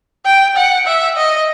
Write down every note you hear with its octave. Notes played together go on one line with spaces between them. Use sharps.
G5
F#5
E5
D#5